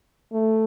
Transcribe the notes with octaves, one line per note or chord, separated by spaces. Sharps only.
A3